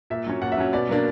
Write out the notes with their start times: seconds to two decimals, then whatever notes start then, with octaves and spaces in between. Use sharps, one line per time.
0.10 A#2 E5
0.26 F#3 C#4
0.42 A#2 F#5
0.52 E5
0.57 F#3 C#4
0.73 B2 D5
0.89 F#3 A#3 D4